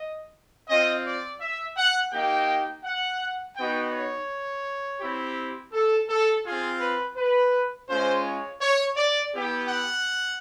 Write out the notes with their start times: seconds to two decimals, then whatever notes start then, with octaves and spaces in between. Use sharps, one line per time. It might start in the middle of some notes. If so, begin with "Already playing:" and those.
Already playing: D#5
0.68 C4 F4 D#5
1.05 D5
1.40 E5
1.76 F#5
2.12 A#3 D#4 G4 G5
2.84 F#5
3.56 B3 D#4 F#4 G5
3.93 C#5
5.01 C4 E4 G4
5.73 A4
6.09 A4
6.44 C4 F4 G#4
6.80 B4
7.17 B4
7.89 G#3 C#4 F4 C5
8.24 C#5
8.61 C#5
8.96 D5
9.33 B3 E4 G4
9.69 F#5